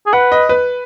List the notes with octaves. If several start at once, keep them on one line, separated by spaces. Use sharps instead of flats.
G#4
B4 F#5
D#5
B4